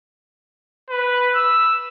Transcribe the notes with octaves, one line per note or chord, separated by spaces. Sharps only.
B4
E6